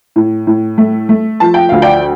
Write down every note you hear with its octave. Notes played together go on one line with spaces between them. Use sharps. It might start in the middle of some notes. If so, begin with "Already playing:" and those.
A2
A2
A3
A3
F3 A5
G5
D2 F5
D5 G5